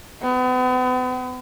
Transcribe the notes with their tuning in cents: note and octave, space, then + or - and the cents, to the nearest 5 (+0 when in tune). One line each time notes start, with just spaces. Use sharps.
B3 +40